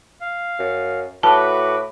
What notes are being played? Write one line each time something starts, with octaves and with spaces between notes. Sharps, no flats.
F5
F#2
A2 F#4 B4 A5 D6